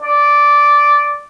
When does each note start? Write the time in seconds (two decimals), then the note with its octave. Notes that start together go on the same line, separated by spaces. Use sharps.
0.03 D5